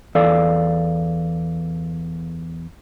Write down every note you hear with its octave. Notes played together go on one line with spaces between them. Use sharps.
E2 A4 D5 F5